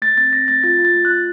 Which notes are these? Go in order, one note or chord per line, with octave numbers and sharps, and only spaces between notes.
A3 A6
C4 A6
C4 A#6
A3 A6
F4 A6
F4
A6
A3
F#6
F4